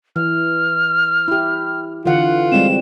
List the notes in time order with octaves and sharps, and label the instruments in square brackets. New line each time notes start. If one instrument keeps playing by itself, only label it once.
[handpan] E3 [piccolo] F6
[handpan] E4 G4
[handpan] D3 E3 F#5 [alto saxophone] F4
[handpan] G3 G#3 C4 [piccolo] E7